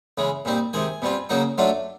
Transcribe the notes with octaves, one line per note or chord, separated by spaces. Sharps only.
C#3 E3 G#3
A#2 G3 C4 D#4
C3 D#3 G#3 G#5
B2 G3 C4 F4
C#3 F#3 A#3 D#4
F#3 A3 D4 F4